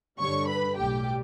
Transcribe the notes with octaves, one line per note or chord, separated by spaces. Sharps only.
G2 D3 G3 C#5 C#6
B4 B5
B1 A2 G3 G4 G5